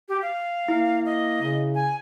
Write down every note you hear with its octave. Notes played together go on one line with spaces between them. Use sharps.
G4
F5
A#3 E4
D#5
C#3
G#5